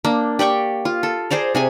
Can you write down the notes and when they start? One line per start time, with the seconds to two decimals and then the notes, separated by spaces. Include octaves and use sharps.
0.05 A#3 D4
0.39 G4 D5 G5 C#6
0.85 F4
1.03 A4
1.30 G#4 C5 D5 A#5
1.55 C3 G#4 G#5